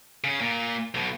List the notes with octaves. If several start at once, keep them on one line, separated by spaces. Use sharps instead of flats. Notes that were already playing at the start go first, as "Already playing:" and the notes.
C#3 C#4
A#2
B1 B2